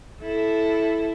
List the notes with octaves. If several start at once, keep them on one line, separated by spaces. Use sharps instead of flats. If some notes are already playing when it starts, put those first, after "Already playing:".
E4 A4